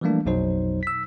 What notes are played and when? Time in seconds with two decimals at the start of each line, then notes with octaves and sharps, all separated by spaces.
0.01 E3 F3 G3 A3 A#3 D4
0.25 A#1 F2 B2 F#3 D#4 C5
0.83 E6 B6